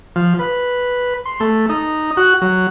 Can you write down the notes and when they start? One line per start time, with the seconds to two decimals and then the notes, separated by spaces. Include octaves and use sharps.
0.16 F3
0.39 B4
1.26 C6
1.40 A3
1.69 D#4
2.17 F#4
2.41 F#3